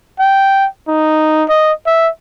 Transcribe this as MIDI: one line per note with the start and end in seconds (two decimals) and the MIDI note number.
0.19 0.67 79
0.88 1.44 63
1.49 1.72 75
1.87 2.09 76